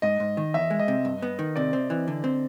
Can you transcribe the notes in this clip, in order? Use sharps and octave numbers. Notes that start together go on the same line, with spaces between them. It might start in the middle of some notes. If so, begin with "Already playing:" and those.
G#2 D#5
G#2
D#3
E2 E5
G#3
D#5
C3
G2
B3
D#3
C3 D5
C4
E3
D3
C4